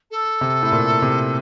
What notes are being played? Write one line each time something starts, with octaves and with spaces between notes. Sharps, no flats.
A4
C3
A2
A#2
C3